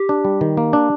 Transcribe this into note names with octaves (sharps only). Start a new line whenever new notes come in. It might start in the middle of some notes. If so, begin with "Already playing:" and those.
Already playing: G4
D4
G3
D#3
A#3
D4